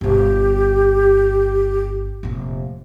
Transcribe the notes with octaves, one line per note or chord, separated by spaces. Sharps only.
G1 B2 G4
F1 A#2